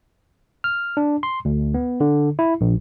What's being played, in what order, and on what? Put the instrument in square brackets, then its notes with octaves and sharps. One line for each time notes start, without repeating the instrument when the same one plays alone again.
[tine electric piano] F6
D4
C6
D2
B3
D3
E4
A#1